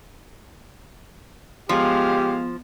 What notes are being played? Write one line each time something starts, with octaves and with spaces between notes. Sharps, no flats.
F3 G#3 B3 G4 F5